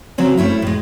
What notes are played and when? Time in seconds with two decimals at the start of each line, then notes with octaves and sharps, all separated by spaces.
0.18 C#3 F#3 C4 C#4
0.37 G3 A3 C#4 E4
0.62 A2 G#3